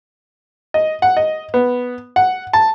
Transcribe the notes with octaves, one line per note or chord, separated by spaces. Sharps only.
D#5
F#5
D#5
B3
F#5
A5